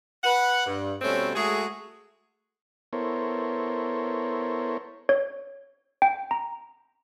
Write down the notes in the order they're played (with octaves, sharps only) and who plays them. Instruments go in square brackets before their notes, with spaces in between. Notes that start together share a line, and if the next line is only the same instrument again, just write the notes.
[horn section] B4 F#5
G2
B2 G3 A3 C4 C#4
G#3 A3 F#4 G#4
[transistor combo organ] B3 E4 A4 A#4 C5 C#5
[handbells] C#5
G5
A#5